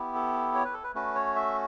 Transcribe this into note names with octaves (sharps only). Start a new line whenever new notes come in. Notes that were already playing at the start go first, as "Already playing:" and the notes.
Already playing: B3 E4 G4
A4
C#5
B4
A4
B4
A3 C#4 F#4 B4
C#5
E5